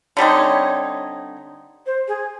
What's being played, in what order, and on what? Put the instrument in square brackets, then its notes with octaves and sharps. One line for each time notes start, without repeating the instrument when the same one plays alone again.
[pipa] D3 G3 C4 D#4 [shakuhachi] C#5
[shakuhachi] C5
G#4